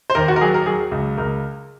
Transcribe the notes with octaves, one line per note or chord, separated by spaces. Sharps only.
C5
D#2 A#4
F#4
A#4
F#3 G#4
A#4
F#3 G#4
C#2
C#2 A#4